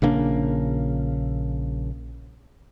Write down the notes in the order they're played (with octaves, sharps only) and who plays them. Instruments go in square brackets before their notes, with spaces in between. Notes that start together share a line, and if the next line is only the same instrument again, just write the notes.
[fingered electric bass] A#1 C#3 A#3 D4